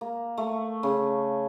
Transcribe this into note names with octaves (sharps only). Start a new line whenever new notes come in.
A#3
A3
C#3